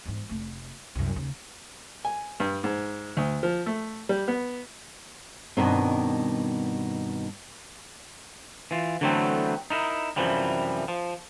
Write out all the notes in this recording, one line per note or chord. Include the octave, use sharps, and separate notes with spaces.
E2 G#2
F1 A3
C2 F#2
D#2 C#3
G#5
G2
G#2
D2
F3
A3
G3
B3
G2 B2 D#3 C4
E3 F4
D3 E3 F#3 A3 B3 C4
D#4 E4 A#4
F#2 A2 C3 E3 F3 G3
F3